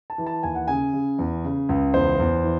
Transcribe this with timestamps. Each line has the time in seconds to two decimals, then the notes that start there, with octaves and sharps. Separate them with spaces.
0.10 A5
0.18 E3
0.26 A5
0.43 D#2 G#5
0.55 F#5
0.68 C#3 G#5
0.93 C#3
1.19 E2
1.44 C#3
1.69 C#2
1.94 E2 C5
2.19 E2
2.44 E3